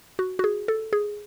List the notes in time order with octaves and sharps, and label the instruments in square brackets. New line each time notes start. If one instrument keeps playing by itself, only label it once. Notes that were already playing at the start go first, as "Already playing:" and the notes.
[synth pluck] F#4
F#4
G#4
A4
G#4